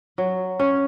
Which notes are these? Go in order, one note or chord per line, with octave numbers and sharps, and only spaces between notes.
F#3
C#4